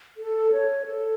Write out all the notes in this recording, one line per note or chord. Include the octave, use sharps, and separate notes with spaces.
A4
C#5
A4